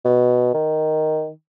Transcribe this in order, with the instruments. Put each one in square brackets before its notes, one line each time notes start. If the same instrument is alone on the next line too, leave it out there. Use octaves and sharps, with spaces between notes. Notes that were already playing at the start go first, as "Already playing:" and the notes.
[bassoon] B2
D#3